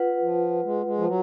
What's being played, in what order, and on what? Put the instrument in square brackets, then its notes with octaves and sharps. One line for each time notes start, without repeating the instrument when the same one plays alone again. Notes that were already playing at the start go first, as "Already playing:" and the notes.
Already playing: [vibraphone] F4 B4 F#5
[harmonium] F3
G#3
G#3
F3
F#3